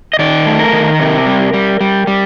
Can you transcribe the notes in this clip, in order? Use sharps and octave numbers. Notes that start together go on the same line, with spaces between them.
D#5
D#3 D5
A3
A#4
D#3
C3
G3
G3
G3
G3